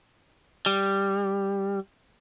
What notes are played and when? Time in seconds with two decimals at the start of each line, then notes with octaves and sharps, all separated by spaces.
0.66 G3